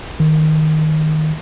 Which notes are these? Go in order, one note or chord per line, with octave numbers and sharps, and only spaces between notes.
D#3